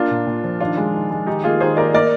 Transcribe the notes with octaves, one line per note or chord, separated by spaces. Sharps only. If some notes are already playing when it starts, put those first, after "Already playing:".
Already playing: A#3 D4 F4
A#2
A#2
F3
D#3 D4 F4
G#3
D#3
G#3
D#3 D#4 G4
A#3 F4 G#4
D#3 G#4 C5
A#3 A#4 D5
A#3 A#4 D5